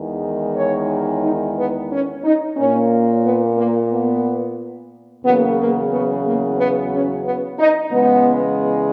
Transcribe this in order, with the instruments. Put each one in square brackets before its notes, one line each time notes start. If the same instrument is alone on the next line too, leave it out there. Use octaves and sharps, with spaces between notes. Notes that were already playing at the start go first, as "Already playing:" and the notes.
Already playing: [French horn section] E2 D#3 G#3
C#5
D#4
B3
C#4
D#4
A#2 A#3 C#4
B3
A#3
B3
E2 C#3 F#3 A#3 B3
A#3
B3
A#3
B3
C#4
B3
D#4
E2 C#3 G#3 B3